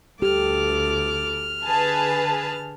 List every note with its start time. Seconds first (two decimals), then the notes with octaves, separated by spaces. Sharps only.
0.22 D2 G4 A4 D6 F6
1.65 D3 G#4 B4 A5